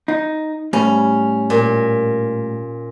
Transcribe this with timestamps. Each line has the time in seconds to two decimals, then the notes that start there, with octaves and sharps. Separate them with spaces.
0.08 D#4
0.73 A2 G3 C#4
1.50 A#2